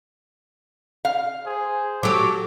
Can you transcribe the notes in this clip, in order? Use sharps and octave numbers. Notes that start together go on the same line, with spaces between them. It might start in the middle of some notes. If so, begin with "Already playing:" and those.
F5
G#4 C5
F#3 G4 A4 D6